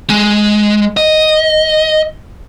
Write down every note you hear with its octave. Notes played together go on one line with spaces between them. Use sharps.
G#3
D#5